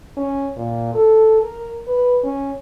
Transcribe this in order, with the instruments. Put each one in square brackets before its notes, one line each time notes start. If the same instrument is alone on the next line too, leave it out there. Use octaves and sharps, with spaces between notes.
[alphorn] C#4
A#2
A4
A#4
B4
C#4